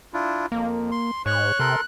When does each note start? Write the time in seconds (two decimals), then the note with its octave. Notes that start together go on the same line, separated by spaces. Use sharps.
0.14 D4 E4 F4
0.52 F2 A#3
0.91 C6
1.26 G#2 C#5 C#6 F#6
1.59 C3 A4 A#4 C6